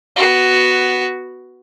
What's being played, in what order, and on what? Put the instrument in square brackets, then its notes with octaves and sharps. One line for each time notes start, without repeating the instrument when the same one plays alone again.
[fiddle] B3 F#4